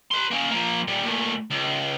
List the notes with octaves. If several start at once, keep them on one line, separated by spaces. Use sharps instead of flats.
B4 C6
A#3 C#4
F3 A#3
A#2 G3
A#2 A3
C#2